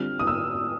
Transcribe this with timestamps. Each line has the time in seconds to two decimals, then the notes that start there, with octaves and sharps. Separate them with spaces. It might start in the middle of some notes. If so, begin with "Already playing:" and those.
Already playing: D3 G3 C4 F4 F6
0.19 D#6
0.27 E6